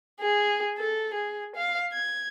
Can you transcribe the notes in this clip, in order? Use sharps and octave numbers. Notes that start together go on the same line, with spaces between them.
G#4
A4
G#4
F5
G#6